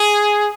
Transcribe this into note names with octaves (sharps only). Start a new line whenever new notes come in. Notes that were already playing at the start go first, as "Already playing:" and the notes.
Already playing: G#4